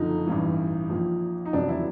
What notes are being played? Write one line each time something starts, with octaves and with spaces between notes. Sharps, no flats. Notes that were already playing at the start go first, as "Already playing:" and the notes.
Already playing: F#1 F2 D3 F3 D#4
A1 G2 E3
A#1 A#2 F3
D#4
F1 E2 C#3 F#3 D4
E4